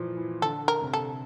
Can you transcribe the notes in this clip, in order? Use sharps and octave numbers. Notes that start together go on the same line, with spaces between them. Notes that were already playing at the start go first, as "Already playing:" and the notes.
Already playing: A#2 E3 F3
E3
D3 A4
A#4
C3
A4